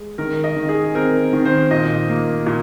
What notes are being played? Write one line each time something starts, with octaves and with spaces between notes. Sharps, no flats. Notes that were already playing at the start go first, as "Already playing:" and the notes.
Already playing: G#3
D#3 A#4
D#5
D#3
G#4
C4 A#4
D#3
C5
A#2 D#5
A#3
A#2